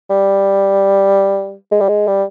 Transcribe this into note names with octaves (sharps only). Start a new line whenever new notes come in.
G3
G#3
G3
G#3
G3